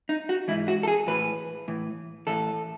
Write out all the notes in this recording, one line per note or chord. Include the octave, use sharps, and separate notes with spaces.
D#4
F#4
G#2 E3 E4
F#4
A4
G#4
A2 E3 B4
A2 E3
A2 E3 A4